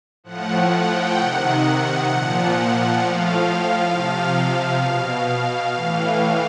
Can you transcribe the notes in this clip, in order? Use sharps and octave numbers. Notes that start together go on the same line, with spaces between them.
A2 F3 F#5
F#5
G5
C3 D#3 F#5
A#2 F3
A2 F3 F5
C3 F3
B2
A2 E3